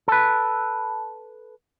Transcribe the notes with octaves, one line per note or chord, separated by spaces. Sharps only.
A4 B4